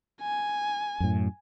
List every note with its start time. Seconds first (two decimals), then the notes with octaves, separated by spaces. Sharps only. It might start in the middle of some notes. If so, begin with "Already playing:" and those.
0.22 G#5
1.00 F#2 A2